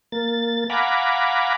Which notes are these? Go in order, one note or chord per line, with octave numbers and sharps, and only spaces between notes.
A#3 A6
F5 F#5 G#5 A#5 B5 D6